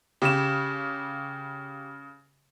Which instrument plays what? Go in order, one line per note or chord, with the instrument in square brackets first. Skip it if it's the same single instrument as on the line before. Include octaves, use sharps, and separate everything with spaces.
[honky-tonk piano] C#3 [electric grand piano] G4 E7